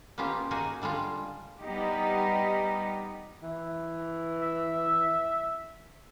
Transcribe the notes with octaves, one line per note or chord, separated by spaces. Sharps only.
A#3 B3 C#4 F4 G4
A#3 D#4 F#4 G#4
D3 G3 G#3 F4
G3 B3 D#4 G4
E3
E5